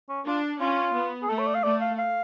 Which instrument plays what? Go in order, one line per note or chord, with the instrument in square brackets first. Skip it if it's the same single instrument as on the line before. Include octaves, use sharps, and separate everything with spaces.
[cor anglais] C#4
[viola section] D4 [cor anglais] F4
[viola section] C#4 [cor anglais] F4
[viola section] B3
[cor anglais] G#4
[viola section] A3 [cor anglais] A4
[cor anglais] C#5
D5
F5
[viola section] A3 [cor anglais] D5
[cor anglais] F5
F5